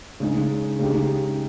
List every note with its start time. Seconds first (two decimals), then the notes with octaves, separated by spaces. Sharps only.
0.20 C#3 G#3 D#4 G#4
0.79 C#3 G#3 D#4 G4